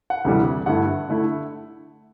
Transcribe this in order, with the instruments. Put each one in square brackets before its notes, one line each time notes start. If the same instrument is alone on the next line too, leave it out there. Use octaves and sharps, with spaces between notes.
[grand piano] F#5
D2 C3 E3 G3
G2 D3 A3 E4 F#5
D3 A3 E4